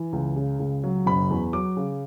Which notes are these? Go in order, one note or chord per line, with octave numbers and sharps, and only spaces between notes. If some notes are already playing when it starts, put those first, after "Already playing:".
Already playing: E3
C#2
C#3
C#2
F#3
F#1 B5
E2
F#3 D6
C#3